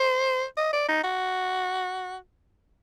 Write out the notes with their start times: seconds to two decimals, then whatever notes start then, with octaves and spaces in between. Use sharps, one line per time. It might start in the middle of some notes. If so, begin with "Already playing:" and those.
Already playing: C5
0.57 D#5
0.73 D5
0.88 D#4
1.04 F#4